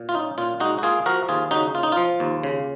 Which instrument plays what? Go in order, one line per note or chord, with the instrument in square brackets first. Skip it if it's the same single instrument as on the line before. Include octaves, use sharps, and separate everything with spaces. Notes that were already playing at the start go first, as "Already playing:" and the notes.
Already playing: [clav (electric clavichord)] A#2
F4
C#4 D#4
A#2 F4
G#3 D#4 F#4
F#4
A#3 F4 G#4
F3 F#4 A#4
D#2 F4 G#4
C#3 D#4 F#4
A#3 F4
D#4
F3 F4
D#2
C#3